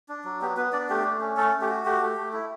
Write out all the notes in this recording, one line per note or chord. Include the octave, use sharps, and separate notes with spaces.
D4
F#3
B3 G4
B3 B4
D4 D5
A3 G4
A3
C#4
A3 A4
A3
G4
F#4
A3 G4
A3
A3
E4